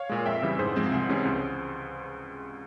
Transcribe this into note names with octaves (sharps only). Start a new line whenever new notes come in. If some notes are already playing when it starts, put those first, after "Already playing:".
Already playing: C#5 F5
A#2 G#3
F2 E5 G5
C#3 E3 G3
G#2 G#4 C5
F3 G#3 C4
C2
C3 E3 G#3 C#4
C#2